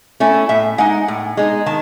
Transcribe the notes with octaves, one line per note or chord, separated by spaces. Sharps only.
A3 C#4 E4
A2 E5
G#3 D#4 F#5
A2
G#3 D#4
D#3 A5